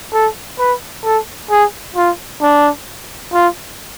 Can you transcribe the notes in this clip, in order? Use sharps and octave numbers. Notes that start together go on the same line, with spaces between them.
A4
B4
A4
G#4
F4
D4
F4